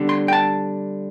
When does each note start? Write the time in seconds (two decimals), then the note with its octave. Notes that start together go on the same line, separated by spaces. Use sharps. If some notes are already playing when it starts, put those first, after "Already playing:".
Already playing: D3 G3 B3 D4
0.09 C6
0.28 G5
0.33 A5